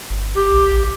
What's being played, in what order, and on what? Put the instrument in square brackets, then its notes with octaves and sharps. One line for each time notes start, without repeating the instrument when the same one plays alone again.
[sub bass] G1
[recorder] G4
[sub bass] B1
A1